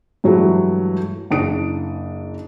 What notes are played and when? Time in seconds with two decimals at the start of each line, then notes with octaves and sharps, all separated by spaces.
0.24 G2 E3 F#3 G#3 A3
1.31 F#1 D4 D#6 D7